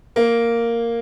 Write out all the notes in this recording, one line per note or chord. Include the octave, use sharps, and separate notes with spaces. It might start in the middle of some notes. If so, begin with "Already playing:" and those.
A#3